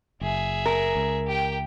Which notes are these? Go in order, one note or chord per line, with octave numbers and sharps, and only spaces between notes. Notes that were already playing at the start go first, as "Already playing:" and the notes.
F#1 G#4 E5
A#4
C#2
G4 G5